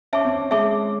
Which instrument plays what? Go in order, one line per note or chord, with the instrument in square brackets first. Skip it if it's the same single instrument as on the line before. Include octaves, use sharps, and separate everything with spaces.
[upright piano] C#4 [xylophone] E5 A5 D6
[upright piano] C4
[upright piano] G#3 [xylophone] E5 A5 D6